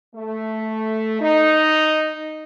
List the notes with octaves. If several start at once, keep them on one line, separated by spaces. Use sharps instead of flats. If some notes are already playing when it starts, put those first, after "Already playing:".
A3
D#4